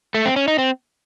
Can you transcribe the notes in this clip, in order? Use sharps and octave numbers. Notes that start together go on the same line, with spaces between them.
A3
C4
C#4
D#4
C4